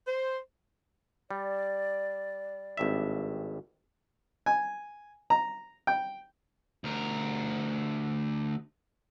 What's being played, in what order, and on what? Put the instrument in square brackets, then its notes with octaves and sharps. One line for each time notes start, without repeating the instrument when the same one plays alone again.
[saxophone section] C5
[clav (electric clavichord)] G3 [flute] D5
[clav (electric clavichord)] G#1 G2 E5
[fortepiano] G#5
A#5
G5
[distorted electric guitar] D2 A#4